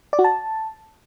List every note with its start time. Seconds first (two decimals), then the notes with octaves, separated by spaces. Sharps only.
0.13 D5
0.19 F#4
0.24 A5